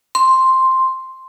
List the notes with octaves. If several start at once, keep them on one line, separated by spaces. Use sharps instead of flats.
C6